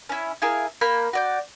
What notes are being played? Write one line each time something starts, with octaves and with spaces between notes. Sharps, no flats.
C#4 E4
E4 F4 G#4 A#4
A#3 B5 F6 G6
F#4 D5 G6